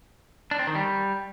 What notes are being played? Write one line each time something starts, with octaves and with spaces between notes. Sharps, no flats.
D4
C4
D#3
G3